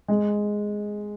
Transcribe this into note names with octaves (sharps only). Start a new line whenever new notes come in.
G#3